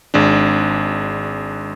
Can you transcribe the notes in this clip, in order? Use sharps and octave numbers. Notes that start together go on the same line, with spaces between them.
G#1 G#3 D4